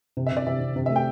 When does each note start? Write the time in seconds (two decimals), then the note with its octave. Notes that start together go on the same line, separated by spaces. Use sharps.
0.17 C3
0.26 E5
0.32 C3 D5
0.47 C3 E5
0.61 C3
0.76 C3
0.86 E5
0.90 A3
0.95 G4 G5